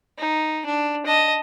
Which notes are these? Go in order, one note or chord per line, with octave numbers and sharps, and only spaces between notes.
D#4
D4
D#5 A5